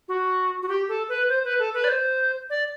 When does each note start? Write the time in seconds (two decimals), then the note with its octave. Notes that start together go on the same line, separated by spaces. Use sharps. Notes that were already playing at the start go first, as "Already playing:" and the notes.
0.08 F#4
0.62 F#4
0.69 G4
0.89 A4
1.09 B4
1.29 C5
1.44 B4
1.59 A4
1.74 B4
1.84 D5
1.89 C5
2.50 D5